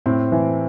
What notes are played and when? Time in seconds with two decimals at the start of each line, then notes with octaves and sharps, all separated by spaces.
0.06 A2 C4
0.32 E3